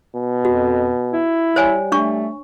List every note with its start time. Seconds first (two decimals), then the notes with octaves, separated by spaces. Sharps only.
0.16 B2
0.45 F2 F#4
1.13 E4
1.56 G3 C5 C#5 G#5
1.92 A3 D4 C#6